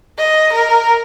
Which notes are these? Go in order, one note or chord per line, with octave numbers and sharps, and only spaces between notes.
D#5
A#4